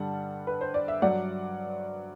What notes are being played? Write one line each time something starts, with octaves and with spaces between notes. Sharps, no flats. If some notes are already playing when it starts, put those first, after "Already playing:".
Already playing: G2 D3 G3 F#5 A5
B4
C5
D5
E5
G2 F#3 D5 F#5